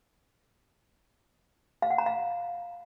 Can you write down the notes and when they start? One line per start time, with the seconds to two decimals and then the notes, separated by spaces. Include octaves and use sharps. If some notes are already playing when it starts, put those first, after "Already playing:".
1.82 F5
1.90 F#5
1.98 A#5
2.06 F5